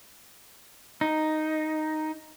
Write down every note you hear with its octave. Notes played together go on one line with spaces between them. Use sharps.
D#4